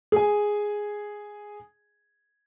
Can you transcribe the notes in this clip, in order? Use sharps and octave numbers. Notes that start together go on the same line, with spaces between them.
G#4 G#5